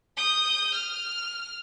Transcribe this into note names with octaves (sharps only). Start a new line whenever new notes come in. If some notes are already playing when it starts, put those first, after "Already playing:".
D#6 G6
F6